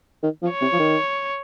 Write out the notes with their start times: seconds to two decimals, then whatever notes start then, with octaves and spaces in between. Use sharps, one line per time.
0.23 D#3
0.43 F3
0.52 C#5
0.61 C3
0.73 F3
0.79 D#3